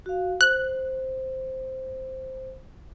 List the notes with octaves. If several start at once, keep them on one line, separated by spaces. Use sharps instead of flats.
F#4 F5
C5 F#6